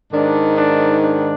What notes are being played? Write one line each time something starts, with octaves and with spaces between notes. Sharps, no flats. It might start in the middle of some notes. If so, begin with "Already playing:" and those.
G#2 D#3 D4
D4
D4